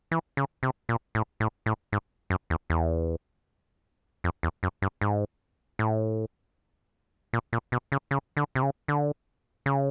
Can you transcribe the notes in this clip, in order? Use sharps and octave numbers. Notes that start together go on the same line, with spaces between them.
E3
C#3
C3
A#2
A2
A2
A2
G#2
F#2
E2
E2
F2
E2
F#2
G2
G#2
A2
A#2
A#2
B2
C#3
C#3
D3
C3
C#3
D3
C#3